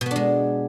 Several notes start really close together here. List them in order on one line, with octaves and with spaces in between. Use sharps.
B2 B3 D4 G#3